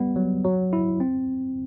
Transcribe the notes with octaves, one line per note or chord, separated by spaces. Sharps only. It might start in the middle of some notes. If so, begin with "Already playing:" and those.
Already playing: G3 B3
F#3
F#3
E4
C4